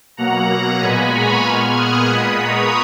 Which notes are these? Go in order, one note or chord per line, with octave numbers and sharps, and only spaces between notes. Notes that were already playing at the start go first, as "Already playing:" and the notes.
B2 F#3 A#3 F#5 A#5
A#2 G#3 B3 G#5 B5
A#5 C#6
A#2 G#3 B3 F6 G#6
D#6 F#6
A#2 G#3 B3 B5 D#6
A#5 C#6